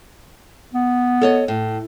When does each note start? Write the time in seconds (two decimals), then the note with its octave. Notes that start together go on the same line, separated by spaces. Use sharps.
0.74 B3
1.21 A4 C#5 D#5
1.48 A2